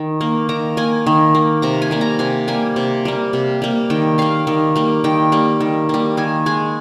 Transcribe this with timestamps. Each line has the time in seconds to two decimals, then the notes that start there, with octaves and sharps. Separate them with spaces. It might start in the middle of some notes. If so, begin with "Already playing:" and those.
Already playing: D#3
0.21 A#3
0.49 D#3 A#5
0.77 A#3 G#5
1.06 D#3
1.35 A#3
1.62 C3 A#5
1.82 G#5
1.91 G3 A#3
2.01 A#5
2.19 C3 G#5
2.48 G3 A#3 G#5
2.76 C3
3.05 G3 A#3
3.33 C3
3.62 G3 A#3
3.90 D#3 G5
4.18 G3 A#3 F5
4.47 D#3
4.76 G3 A#3
5.04 D#3 G5
5.32 G3 A#3
5.60 D#3
5.89 G3 A#3
6.17 D#3 G#5
6.46 G#3 G#5